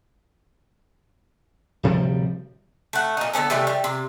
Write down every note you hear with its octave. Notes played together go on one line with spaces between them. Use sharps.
D1 C3 F3 G3
A3 F#5
A#2 D#4
D3 B3 C#4 A4
C3 E3 G3 A3
G3
C3